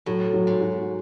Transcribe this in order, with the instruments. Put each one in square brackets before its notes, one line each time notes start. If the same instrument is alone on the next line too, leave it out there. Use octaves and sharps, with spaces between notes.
[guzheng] A2 [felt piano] F#3
[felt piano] F#3
[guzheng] G#2
[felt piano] F#4